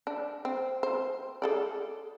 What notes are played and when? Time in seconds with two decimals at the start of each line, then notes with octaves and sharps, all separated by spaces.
0.07 D4
0.45 C4
0.83 C5
1.42 G#4 A4 D5